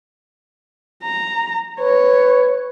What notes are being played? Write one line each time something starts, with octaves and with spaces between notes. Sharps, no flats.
A#5
B4 C#5